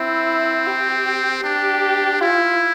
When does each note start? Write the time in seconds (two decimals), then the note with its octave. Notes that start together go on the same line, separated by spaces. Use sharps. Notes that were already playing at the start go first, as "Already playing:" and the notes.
Already playing: C4 E4
0.67 G4
1.44 D4 G4
2.21 E4 F4